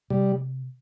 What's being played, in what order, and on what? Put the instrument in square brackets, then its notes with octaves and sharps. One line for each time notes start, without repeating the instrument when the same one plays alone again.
[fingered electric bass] C3 [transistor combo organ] G3